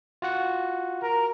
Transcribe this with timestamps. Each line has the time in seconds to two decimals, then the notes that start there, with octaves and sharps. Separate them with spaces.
0.22 F4 F#4 F#5
1.03 A#4